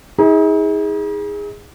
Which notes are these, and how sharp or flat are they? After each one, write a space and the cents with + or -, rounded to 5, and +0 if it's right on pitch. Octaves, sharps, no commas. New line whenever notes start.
D#4 +45 G#4 -15